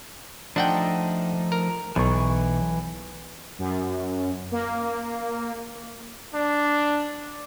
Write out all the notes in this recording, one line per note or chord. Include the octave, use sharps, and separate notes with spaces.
F3 A3 D4 D#4 F#5 G5
A#4
B1 E3 C#6
F#2
A#3
D4